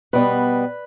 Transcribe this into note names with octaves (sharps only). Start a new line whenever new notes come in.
B2 G3 B3 B4